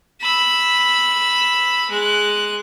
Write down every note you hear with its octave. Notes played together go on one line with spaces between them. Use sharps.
B5 E6
G#3 F#6